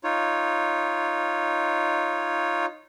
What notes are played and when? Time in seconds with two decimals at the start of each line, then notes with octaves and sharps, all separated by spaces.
0.04 D#4 F4 C#5